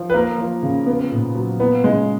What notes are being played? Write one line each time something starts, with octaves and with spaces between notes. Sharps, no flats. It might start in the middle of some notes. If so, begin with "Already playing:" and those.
Already playing: F3
B4
A#3 A#4
F3
C#3
B3
A#2
F#3
A#3 B3
C#3 G#3